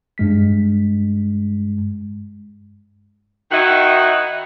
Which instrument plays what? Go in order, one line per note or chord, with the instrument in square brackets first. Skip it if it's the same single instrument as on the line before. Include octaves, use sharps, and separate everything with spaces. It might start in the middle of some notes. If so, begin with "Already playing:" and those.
[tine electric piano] G2 G#3 B6
[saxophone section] D#3 D#4 E4 F#4